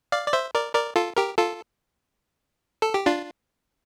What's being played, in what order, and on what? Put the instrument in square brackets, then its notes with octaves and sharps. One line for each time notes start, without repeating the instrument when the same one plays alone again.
[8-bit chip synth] D5 F5
D5
C5 E5
A#4 D5
A#4 D5
F4 A4
G4 A#4
F4 A4
A4
G4
D4 F4